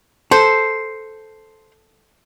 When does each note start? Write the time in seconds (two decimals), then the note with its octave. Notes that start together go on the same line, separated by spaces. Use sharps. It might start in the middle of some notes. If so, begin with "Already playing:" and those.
0.31 A4 C5